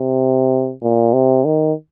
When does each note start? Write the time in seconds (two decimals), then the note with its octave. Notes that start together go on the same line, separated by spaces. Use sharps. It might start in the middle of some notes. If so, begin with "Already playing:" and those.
Already playing: C3
0.83 A#2
1.13 C3
1.45 D#3